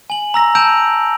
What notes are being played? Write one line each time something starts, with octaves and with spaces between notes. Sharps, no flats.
G#5 F#7
A#5 E6 A#6
A5 E6 G6 D7 F7